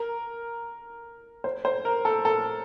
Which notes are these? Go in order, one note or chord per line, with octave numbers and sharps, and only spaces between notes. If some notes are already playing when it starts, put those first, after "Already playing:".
Already playing: A#4
C5
C5
A#4
A4
A4